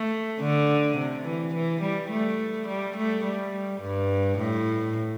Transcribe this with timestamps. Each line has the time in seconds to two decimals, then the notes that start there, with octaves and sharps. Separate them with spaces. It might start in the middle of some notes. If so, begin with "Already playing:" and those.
Already playing: A3
0.40 D3
0.98 C3
1.26 E3
1.55 E3
1.82 G3
2.11 A3
2.68 G3
2.97 A3
3.24 G3
3.82 G2
4.39 A2